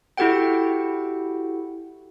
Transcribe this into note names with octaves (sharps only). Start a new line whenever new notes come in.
E4 F#4 G4 A4 F#5 G5